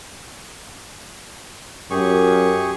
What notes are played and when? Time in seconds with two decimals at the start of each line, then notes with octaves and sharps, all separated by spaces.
1.90 F#2 G4 G#4 C#6